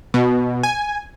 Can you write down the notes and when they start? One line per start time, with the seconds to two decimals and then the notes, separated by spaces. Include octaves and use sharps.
0.14 B2
0.63 G#5